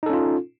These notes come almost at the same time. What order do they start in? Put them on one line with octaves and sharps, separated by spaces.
D#4 A4 C#4 F4